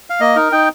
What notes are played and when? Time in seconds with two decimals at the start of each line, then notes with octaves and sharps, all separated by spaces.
0.10 F5
0.20 A#3 D#5
0.36 D#4 A#4
0.52 D#4 G5